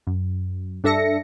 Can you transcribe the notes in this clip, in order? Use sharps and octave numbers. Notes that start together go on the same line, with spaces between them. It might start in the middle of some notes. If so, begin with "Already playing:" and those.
F#2
G2 D4 A4 E5 A#6 C#7